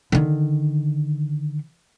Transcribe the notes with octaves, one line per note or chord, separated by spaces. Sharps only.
D3 D#3